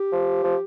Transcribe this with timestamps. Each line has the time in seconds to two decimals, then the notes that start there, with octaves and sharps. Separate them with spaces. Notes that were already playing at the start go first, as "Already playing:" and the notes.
Already playing: G4
0.12 F3
0.44 F3